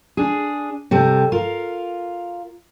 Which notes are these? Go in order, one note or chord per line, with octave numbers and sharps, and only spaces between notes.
D4 G#4
C3 G3 A4
F4 A#4